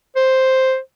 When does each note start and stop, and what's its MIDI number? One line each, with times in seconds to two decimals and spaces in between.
0.16 0.78 72